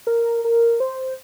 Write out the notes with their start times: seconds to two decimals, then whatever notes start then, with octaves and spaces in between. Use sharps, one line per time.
0.07 A#4
0.44 A#4
0.80 C5